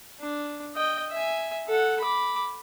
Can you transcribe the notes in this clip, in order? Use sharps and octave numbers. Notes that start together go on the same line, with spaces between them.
D4
D#5 G5
E5 G#5
A4 F#5
B5 D6